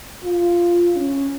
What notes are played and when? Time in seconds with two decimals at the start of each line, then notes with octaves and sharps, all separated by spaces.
0.24 F4
0.96 C#4